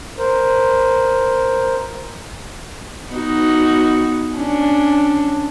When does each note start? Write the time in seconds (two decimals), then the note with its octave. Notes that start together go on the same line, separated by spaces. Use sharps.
0.18 A#4 C5
3.10 B3 D#4 F#4
4.36 C#4 D4